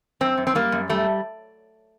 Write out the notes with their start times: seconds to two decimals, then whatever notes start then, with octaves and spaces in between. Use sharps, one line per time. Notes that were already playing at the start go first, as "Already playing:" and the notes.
0.21 F#2 C4
0.37 F#2
0.47 C4
0.55 G3 A#3
0.72 F#2
0.89 G3 A3